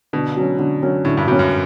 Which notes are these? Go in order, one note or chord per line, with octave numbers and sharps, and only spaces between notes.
B2 D3
F#3 C#4
D3
F#3 C#4
A2 D3
G2
G2 F#3 C#4
F#2